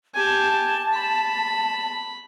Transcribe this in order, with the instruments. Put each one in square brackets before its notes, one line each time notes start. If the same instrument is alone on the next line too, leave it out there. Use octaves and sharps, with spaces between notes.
[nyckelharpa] G4 G#5 [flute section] A5
[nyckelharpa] B5